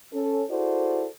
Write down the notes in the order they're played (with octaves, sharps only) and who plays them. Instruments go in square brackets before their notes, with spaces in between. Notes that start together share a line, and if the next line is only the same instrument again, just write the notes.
[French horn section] C#4 A4
E4 F#4 G#4 A4 C5 D5